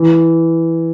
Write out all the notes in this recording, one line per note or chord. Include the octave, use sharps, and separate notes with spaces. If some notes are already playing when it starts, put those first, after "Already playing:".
Already playing: E3